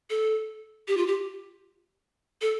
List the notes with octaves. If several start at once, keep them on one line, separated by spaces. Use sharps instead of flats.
A4
G4
F4
G4
A4